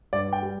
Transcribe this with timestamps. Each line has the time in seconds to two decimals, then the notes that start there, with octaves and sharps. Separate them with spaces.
0.13 G2 D5
0.33 G5
0.42 G3